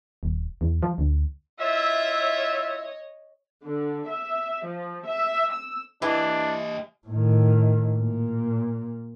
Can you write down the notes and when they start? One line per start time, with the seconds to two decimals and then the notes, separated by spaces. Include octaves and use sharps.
0.23 D#1
0.61 E2
0.83 F3
0.98 D2
1.60 E4 F4 C#5 D#5 E5
3.63 D3
4.08 E5
4.65 F3
5.06 E5
5.52 E6
6.02 E3 D4 G4 D#5
7.07 A2 D#3
7.96 A#2